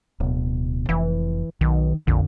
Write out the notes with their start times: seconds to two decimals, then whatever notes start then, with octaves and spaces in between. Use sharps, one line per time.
0.20 D1 B2
0.89 F1 E3
1.61 B1 D#3
2.07 A#1 F2 D3